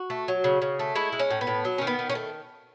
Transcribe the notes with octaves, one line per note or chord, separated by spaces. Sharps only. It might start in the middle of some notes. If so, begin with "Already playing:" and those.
Already playing: F#4
A3
F#3
C#3
C#3
A3
G#3 E4
G#3
C#4
A2
B3
A2
F#3
D#3 C#4
B3
D#3
C#4
A3